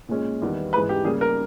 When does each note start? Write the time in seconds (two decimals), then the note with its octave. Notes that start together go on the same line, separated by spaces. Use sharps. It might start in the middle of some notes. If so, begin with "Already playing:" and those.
0.08 A#2 G#3 C#4
0.42 E2 D#3 G3 B3
0.73 G#2 E3 G#3 D#4 B4
0.89 G4
1.04 C#3 G3 A#3 G#4
1.21 A#4